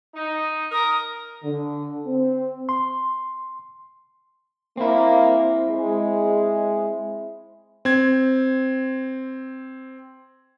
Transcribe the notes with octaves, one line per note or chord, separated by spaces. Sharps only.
D#4
A#4 D#6
D3
C4
C6
A#3 C4 E4
G#3
C4 G#6